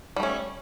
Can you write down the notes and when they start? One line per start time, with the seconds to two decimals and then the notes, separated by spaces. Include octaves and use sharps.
0.16 G3
0.20 A3
0.23 C#4